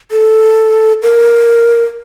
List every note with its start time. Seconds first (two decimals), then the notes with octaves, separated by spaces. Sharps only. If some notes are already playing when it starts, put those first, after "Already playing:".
0.12 A4
1.03 A#4